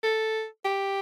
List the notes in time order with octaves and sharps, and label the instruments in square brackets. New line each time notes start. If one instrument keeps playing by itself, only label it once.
[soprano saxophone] A4
G4